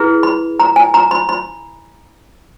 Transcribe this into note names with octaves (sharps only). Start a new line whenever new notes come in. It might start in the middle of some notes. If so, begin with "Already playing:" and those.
Already playing: E4 G#4 B4
B5
A#5
G#5
A#5
B5
B5